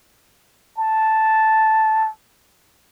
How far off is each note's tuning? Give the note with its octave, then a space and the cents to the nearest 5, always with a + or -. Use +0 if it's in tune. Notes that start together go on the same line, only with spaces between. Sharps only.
A5 -5